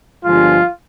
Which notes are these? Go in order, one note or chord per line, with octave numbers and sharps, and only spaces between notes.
G1 G2 F3 G#3 F4